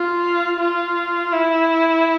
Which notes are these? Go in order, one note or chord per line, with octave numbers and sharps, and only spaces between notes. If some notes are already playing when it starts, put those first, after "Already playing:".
Already playing: F4
F4
E4